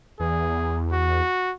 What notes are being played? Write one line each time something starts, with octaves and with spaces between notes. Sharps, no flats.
E2 G#4
F#4